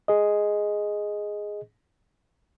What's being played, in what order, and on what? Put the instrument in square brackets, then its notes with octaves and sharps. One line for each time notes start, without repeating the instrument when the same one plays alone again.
[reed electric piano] G#4 D#5